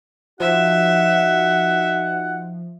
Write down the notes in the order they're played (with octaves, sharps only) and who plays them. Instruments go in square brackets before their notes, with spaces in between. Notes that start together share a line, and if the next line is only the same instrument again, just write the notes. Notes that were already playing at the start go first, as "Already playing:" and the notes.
[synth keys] F3 [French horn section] D#4 F#4 [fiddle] E5 [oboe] F#5